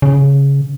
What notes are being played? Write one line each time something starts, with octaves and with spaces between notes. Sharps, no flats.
C#3